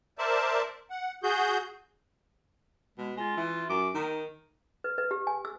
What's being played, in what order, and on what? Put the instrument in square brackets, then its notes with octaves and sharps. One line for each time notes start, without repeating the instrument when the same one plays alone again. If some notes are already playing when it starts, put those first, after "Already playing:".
[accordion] A#4 C5 D5 E5 A5
F#5
F#4 G#4 G6
[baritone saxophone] B2 [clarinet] G#3
[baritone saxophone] G#3 [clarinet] F4
[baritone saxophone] E3
[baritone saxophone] F#2 [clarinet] D6
[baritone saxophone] D#3 [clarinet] D#4
[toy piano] B4
B4
G4
G#5
E6